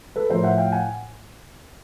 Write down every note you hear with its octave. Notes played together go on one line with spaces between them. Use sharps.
A4 B4
A2 F3 A#4 C5
E5 F#5
F5 G5
F#5 G#5